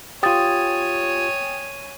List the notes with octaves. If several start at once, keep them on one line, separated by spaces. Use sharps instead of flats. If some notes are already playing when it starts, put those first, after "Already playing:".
F4 G4 C#5 G5 G#5 D#6 A6